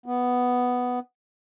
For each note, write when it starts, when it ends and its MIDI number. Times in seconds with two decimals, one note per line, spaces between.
0.06 0.99 59